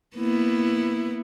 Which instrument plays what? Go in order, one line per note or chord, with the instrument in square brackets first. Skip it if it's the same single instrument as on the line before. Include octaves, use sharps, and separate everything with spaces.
[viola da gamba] A#3 B3 E4